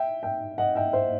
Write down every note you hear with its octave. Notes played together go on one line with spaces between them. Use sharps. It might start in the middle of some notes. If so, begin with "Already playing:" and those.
Already playing: E5 G5
E5 G5
D#5 F#5
E5 G5
C5 E5